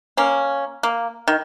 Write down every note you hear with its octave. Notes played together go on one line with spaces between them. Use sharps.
A#3 C#4
A#3
D#3